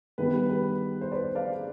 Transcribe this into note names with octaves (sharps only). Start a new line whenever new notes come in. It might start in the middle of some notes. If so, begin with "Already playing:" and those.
G2 D#3 G3 B3 B4
B4
C5
B4 D5
D5 F5